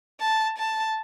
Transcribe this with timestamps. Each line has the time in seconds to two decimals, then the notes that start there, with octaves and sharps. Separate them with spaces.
0.20 A5
0.58 A5